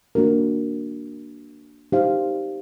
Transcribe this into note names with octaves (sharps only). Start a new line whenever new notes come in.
A#3 D4 F#4 A#4
D#4 G4 C5 F5